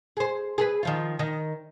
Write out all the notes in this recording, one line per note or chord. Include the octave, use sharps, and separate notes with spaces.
G#4 C5
G#4 A4 B4
D#3 F3 F4
D#3